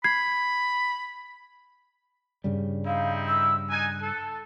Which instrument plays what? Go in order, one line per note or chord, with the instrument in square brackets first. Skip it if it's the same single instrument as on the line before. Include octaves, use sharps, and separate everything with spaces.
[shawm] B5 [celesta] G#6 C7
[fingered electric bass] G2 C#3 G3
[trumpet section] C4 D#4 E4 [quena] F5
[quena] E6
[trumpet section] D#4 G#5 [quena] F#6
[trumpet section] A4